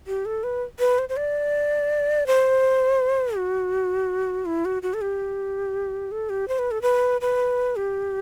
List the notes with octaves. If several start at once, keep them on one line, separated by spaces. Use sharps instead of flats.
G4
A4
B4
B4
C5
C5
D5
C5
F#4
E4
F#4
F#4
A4
G4
A4
G4
C5
B4
A4
B4
B4
G4